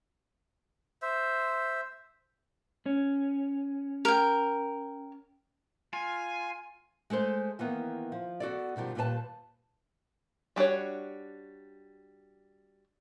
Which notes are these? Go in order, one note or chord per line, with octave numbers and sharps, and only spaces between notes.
C5 E5
C#4
A#4 G5
F4 G#5
G#3 A3 A4 C5
D#3 E3 A#3 B3
F3
B3 F#4 A4 D5
B2 D#3 F3 G3
D#2 A#2 G3 G4 B4 A5
G3 D4 F#4 C#5